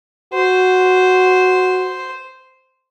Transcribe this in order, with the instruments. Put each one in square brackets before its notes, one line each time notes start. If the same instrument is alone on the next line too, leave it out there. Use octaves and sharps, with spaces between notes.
[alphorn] F#4 [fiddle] C5